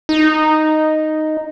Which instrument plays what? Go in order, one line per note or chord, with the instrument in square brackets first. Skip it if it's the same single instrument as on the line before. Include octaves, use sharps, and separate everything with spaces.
[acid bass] D#4